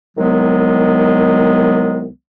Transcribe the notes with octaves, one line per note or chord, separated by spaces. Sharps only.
C2 D#3 F#3 G#3 B3